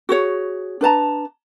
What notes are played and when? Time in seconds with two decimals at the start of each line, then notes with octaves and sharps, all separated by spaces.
0.09 F#4 G#4 C#5
0.81 D4 B4 A5 A#5